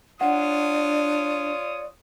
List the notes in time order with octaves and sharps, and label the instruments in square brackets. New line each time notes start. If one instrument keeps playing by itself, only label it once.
[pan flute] D4 [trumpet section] F4 C#5 D#6 [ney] D5 [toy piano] F#5